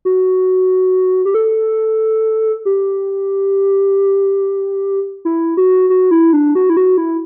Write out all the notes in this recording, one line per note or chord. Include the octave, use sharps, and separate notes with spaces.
F#4
G4
A4
G4
E4
F#4
F#4
E4
D4
F#4
E4
F#4
E4